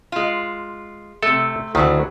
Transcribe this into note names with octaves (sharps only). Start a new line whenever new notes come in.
G#3 F4
C3 A3 A4
D2 D#3 E3 F#3 D4